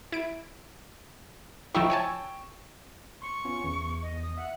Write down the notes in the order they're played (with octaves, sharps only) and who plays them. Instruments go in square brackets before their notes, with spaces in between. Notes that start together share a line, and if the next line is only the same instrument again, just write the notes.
[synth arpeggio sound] E4 D7
[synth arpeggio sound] F3 D#4 E4 [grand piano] G5 C#6 E6
[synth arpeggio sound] C#5 G#5 A5
[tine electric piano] C6 [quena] C#6
[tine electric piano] B3 C#4 F4
E2
[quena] D#5
D#6
[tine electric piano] E5 [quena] F#5